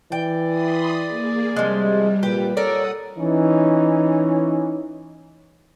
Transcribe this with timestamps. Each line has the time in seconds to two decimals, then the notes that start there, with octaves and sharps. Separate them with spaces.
0.12 E3 D5 G5
0.47 B5 C6 D#6
1.04 A#3 G#4
1.56 C3 F3 G3 G#3
2.23 A#2 G4 B4
2.57 A4 A#4 C#5 D5 F#5 D#6
3.18 E3 C#4 D#4